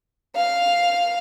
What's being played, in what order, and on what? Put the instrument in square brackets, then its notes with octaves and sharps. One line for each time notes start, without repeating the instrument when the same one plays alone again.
[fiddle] F5